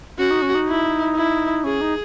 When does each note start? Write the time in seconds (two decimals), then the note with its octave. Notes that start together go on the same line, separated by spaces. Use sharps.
0.18 C#4 F#4
0.31 D#4
0.42 C#4
0.55 D#4
0.67 E4
1.15 E4
1.64 C#4 G#4
1.81 D#4